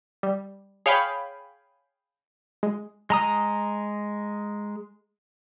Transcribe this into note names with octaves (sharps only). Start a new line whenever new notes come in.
G3
G#4 C#5 F5 G5 G#5 B5
G#3
G#3 A#5 D#6